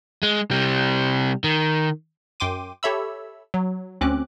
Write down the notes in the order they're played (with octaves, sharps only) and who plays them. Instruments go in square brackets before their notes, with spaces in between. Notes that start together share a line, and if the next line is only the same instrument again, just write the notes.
[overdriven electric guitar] G#3
C3 G3
D#3
[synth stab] F#2 G5 C6 D6 D#7
G4 A4 C#5 E5 B5 E6
F#3
D2 C4 C#4 D6 F#6